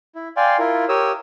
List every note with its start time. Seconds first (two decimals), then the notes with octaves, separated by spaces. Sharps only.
0.15 E4
0.37 D5 F5 G5 G#5 C6
0.59 E4 F4 A#4
0.89 G4 A#4 C#5 D#6 E6